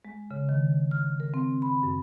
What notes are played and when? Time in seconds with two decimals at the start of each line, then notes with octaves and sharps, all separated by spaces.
0.05 G#3
0.31 C#3
0.49 D#3
0.91 F6
1.20 A#4
1.34 C4
1.62 B5
1.83 F#2